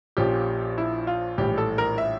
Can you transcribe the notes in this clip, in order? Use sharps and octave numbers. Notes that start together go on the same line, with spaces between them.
A#1 A#2 F3 C#4 G4
E4
F4
A#1 A2 E3 G3 G4
A4
A#4
E5